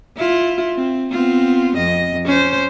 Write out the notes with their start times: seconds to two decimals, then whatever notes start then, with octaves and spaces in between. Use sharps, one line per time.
0.17 E4 F4
0.76 C4
1.11 B3 C4 F4
1.77 F2 D#5
2.25 C#4 C5